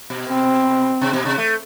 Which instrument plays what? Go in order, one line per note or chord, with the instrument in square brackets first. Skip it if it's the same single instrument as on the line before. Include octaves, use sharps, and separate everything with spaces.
[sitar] B2
[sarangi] C4
[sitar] C3
B2
C3
A3